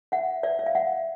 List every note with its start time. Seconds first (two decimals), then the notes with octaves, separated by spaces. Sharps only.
0.12 E5 F#5
0.43 D5 E5
0.59 E5
0.66 F5
0.75 E5 F#5